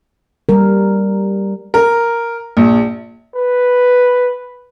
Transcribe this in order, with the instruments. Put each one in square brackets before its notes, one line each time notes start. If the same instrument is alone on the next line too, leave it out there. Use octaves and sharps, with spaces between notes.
[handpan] G3 A#4
[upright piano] A#4
A#1
[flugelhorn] B4